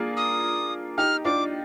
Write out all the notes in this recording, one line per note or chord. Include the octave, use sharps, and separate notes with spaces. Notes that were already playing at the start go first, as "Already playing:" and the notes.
Already playing: A#3 D4 F4 G#4
D#6
D#4 G4 F6
D4 F4 D6